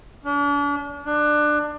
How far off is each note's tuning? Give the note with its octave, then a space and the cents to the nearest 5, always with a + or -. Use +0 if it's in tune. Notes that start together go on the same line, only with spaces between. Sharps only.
D4 -40
D4 +20